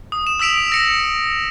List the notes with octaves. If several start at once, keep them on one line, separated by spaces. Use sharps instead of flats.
D#6
E7
D#6 E6 B6 D7 F7
A#6 C#7